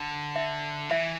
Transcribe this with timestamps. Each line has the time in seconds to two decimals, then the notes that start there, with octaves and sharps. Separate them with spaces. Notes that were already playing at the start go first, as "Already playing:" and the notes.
Already playing: D3
0.36 E5
0.90 E3 E5